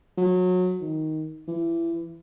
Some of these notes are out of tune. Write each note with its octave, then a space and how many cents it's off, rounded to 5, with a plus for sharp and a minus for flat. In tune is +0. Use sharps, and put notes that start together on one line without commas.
F#3 -25
D#3 +10
E3 +25